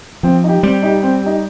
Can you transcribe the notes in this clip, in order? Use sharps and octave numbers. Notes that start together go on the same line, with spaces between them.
F3 C4
D#4 G4
G3 C4
D#4 G4
C4
D#4 G4